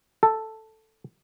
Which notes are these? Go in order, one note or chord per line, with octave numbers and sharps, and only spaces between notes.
A4